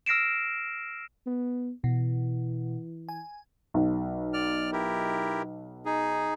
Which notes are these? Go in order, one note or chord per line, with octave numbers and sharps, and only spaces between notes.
E6 F6 A#6 C7 D7 E7
B3
B2 E3
G#5
B1
D5 F6
E4 G4 A#4
D#4 G#4